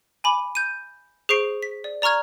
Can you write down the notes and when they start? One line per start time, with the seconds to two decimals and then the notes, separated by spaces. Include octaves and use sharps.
0.24 G#5 B5 D6
0.55 G6 D#7
1.29 G#4 C5 C#6 C7 D7
1.63 B6
1.84 D5
2.02 D5 A#5 C#6 F6 G#6